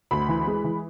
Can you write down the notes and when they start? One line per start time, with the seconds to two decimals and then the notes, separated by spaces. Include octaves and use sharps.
0.11 D2 B5
0.29 E3
0.47 G#3
0.64 E3